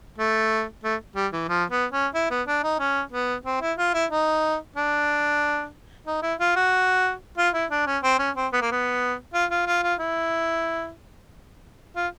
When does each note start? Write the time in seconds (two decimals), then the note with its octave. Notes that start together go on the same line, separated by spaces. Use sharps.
0.18 A3
0.84 A3
1.16 G3
1.32 E3
1.49 F3
1.70 B3
1.92 C#4
2.14 E4
2.30 B3
2.47 D4
2.64 D#4
2.79 C#4
3.12 B3
3.45 C4
3.61 E4
3.78 F4
3.94 E4
4.10 D#4
4.76 D4
6.07 D#4
6.22 E4
6.39 F4
6.56 F#4
7.38 F4
7.54 E4
7.71 D4
7.87 C#4
8.03 C4
8.19 C#4
8.36 C4
8.52 B3
8.62 A#3
8.71 B3
9.34 F4
9.50 F4
9.67 F4
9.83 F4
9.99 E4
11.96 F4